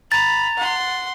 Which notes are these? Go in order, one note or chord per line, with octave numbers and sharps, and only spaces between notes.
A#5 B5 A6
F#5 C6